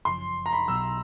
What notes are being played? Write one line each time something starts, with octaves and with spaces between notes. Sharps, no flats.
G1 F#2 C#3 F3 C6
A#5
B5
B1 B2 F#3 E6